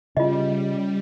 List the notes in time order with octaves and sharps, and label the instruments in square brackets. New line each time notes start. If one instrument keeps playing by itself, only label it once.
[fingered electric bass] C#3 [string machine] G3 [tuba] C#4 [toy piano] F4 D#5